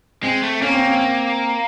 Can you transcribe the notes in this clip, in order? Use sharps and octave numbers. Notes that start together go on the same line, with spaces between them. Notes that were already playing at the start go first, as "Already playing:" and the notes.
G#3 C4
A3
A#3 C#4
C4
C4